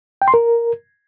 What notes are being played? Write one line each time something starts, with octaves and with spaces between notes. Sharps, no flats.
G5
C6
A#4